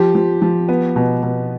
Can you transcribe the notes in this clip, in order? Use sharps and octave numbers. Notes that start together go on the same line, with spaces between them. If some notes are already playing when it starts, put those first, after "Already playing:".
Already playing: F3 G4
F3
F3
B3
B2
B2